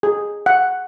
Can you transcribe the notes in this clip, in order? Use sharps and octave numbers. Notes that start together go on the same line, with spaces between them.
G#4
F#5